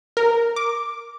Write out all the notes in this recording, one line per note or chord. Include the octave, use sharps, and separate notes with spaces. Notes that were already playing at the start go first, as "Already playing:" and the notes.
A#4
D6